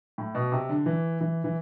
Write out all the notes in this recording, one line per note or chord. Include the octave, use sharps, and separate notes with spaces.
A2
B2
C3
D3
E3
E3
E3